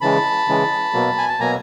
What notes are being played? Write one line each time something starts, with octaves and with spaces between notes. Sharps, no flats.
C#3 E3 G#3 A5 B5
C#3 E3 G#3
B2 F#3 A#3
G#5
A5
B2 F#3 A#3 G#5 A#5